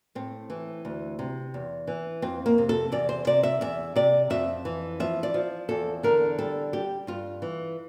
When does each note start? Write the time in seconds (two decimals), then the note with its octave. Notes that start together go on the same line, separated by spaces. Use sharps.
0.15 A2 C4
0.50 E3
0.85 D2
1.19 C3
1.54 E2
1.87 E3
2.22 F2 C4
2.46 A#3
2.58 C3
2.69 A4
2.92 E2 D5
3.09 C5
3.27 C3 D5
3.43 E5
3.61 E2 E5
3.96 C3 D5
4.30 F2 E5
4.65 E3
5.00 F3 E5
5.23 D5
5.34 F3
5.69 E2 A4
6.03 D3 A#4
6.38 G3 A4
6.73 G3 G4
7.07 G2 F4
7.42 E3